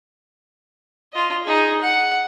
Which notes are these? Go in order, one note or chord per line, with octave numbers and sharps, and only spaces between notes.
F4 D#5
D#4 G#4
F#5